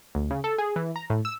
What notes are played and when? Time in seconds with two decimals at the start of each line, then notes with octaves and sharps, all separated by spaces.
0.15 D2
0.31 C#3
0.44 A4
0.58 G#4
0.76 E3
0.96 A#5
1.10 A2
1.25 E6